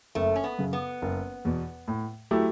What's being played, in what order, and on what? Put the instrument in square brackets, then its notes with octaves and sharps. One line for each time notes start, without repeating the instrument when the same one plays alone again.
[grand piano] F#1 [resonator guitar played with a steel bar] A3
[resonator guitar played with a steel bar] C#4
B3
[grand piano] F#2 C#3
[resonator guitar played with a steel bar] B3
[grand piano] F#1
E2 B2
A2
F#3 A3 E4 G4